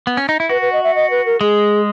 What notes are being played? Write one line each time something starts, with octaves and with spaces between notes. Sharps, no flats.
B3
C#4
D#4
E4
F#4 B4
B4
D#5
E5
D#5
B4
A#4
G#3 G#4